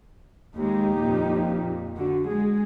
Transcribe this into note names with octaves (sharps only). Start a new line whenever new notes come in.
D#2 G#3 D#4 G4
F2 A#2
D3 F#4
G#3 G#4